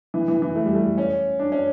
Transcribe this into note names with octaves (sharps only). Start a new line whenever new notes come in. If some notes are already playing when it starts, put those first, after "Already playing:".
E3
E3
E3
A3
G3
A3
C#4
D4
C#4